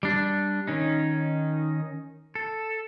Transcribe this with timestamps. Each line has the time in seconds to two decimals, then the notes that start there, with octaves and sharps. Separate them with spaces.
0.03 G3 D4
0.68 D#3 C#4 D#4
2.35 A4